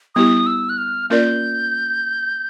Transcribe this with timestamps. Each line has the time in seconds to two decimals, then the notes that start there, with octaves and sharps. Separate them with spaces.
0.15 G3 B3 E4 G4 D#6
0.47 E6
0.69 F#6
0.78 F6
1.10 A#3 C#4 F4 A#4 D5 G6